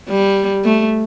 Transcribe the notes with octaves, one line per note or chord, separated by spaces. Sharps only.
G3
A3